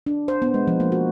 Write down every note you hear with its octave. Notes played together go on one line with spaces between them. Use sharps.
D4
C5
B3
G#3
F3
A#3
F#4